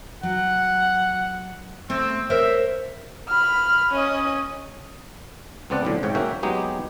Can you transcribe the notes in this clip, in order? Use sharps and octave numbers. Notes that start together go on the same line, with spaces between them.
F#3 F#5
A3 C4
A#4 C5 C#5 E5
B5 F6
C#4 D#5
C#2 B3 C4 D5 F#5 A5
B1 A2 D3
G#1 G#2 C#5 G5
A#3 C#4 F#4 E5 G5
F#3 G#3 B3 D#4 G4 G#4